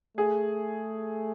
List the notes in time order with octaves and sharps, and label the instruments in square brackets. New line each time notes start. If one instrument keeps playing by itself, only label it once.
[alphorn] A3 [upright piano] G#4